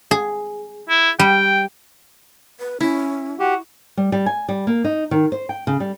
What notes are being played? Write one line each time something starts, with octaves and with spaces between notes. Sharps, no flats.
G#4
E4
G3 G5
B4
C#4 E4
F#4 G4
G3
G3
G#5
G3
A#3
D#4
D#3
C5
G5
C#3
G3